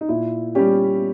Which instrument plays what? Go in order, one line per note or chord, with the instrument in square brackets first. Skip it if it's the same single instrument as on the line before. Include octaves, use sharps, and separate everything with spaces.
[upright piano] D#4
A#2 E4
G3 C#4 G4